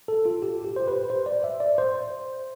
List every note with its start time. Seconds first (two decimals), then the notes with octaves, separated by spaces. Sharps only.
0.08 A4
0.26 F4
0.42 G4
0.65 G4
0.76 C5
0.88 B4
1.10 C5
1.26 D5
1.44 E5
1.60 D5
1.78 C5